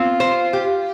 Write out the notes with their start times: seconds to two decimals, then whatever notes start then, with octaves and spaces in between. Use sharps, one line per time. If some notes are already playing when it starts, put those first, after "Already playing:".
Already playing: C4 F4
0.20 C5
0.53 G4